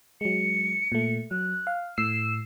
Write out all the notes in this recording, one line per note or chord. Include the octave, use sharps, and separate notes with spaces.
F#3 G#3 C#7
A#2 A3
F#3 F#6
F5
A2 E6 C7 E7